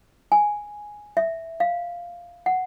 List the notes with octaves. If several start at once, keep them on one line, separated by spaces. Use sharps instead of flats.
G#5
E5
F5
F#5